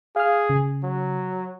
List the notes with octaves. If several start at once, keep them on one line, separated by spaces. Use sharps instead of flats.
G#4 F5 F6
C#3
F#3